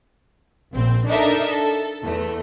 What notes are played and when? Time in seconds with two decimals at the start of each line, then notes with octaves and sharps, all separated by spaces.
0.73 A#1 C4
1.07 D4 D#4 A4 A#4 E5
1.47 A4
2.03 E2 A3